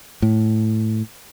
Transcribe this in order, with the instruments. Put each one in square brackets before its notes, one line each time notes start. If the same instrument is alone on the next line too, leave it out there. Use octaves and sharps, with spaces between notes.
[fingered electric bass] A2